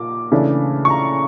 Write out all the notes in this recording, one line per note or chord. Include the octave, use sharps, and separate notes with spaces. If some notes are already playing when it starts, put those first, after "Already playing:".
Already playing: A#2 D6
C#3 E3 A3 D4
C#6
A#5